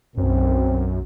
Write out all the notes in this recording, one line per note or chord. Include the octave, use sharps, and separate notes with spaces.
B1 F#2 C4